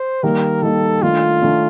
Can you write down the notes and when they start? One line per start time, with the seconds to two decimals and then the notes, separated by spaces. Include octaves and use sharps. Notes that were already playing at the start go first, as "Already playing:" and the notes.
Already playing: C5
0.23 D#3 G3 A#3 D#4 A#4
0.62 D#3 G3 A#3 D#4 A4
1.02 D#3 A3 D4 F4
1.42 D#3 A3 D4